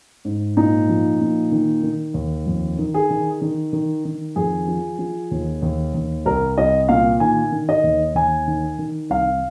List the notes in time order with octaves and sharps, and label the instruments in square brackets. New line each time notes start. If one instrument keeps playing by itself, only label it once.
[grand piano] G#2
A#2 D#4
F3
A#2
D#3
D#3
D#2
F2
D#3
G#4
D#3
D#3
D#3
D#3
F2 G#4
F3
F3
D#2
D#2
D#2
C2 A#4
C2 D#5
A#2 F5
D#3 G#5
D#3
D#5
D#2
D#2 G#5
D#3
D#3
C2 F5